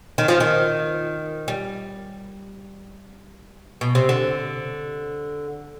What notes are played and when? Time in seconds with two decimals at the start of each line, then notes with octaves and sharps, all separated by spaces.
0.18 D#3
0.28 F3
0.40 D#3
1.48 G3
3.81 B2
3.95 C3
4.09 D3